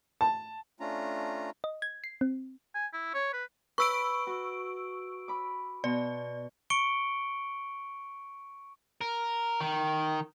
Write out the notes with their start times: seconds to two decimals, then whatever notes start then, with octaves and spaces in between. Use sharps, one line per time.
0.21 A5
0.80 A3 C#4 D4 F4 A#5
1.64 D#5
1.82 G#6
2.04 C7
2.21 C4
2.74 G#5
2.93 E4
3.14 C#5
3.33 B4
3.78 B4 B5 C#6 E6 D7
4.27 F#4
5.28 B5 D6
5.84 B2 D5
6.70 C#6 C#7 D7 G7
9.01 A#4
9.61 D#3